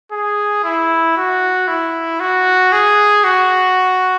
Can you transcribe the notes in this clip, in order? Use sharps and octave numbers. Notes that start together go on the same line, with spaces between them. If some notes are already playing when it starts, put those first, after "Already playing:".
G#4
E4
F#4
E4
F#4
G#4
F#4